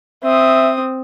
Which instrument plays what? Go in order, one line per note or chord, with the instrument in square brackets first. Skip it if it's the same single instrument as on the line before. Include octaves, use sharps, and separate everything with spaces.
[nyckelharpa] C4 D#6 [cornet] E5